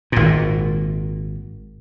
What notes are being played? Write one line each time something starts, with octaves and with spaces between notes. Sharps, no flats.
G#1 A#2